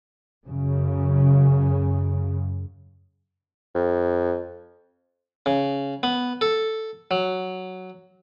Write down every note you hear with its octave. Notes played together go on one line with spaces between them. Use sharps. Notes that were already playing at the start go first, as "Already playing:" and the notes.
F#2 C#3
F2
C#3
B3
A4
F#3